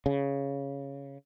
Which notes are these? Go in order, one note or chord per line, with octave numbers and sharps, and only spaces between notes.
C#3